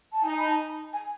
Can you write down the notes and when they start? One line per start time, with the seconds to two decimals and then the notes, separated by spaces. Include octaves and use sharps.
0.13 A5
0.23 D#4 G#5
0.38 B5
0.46 A5
0.93 G#5